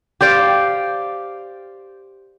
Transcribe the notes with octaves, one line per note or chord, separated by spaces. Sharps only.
G4 C5 D5 F5